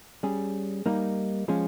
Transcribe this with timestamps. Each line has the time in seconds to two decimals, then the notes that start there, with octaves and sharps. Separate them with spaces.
0.23 G3 C#4 G#4
0.86 G3 A#3 D#4
1.48 F3 G#3 C#4